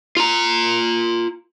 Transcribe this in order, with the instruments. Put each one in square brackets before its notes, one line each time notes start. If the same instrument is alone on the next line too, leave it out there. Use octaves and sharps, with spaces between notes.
[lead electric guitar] F4 A#5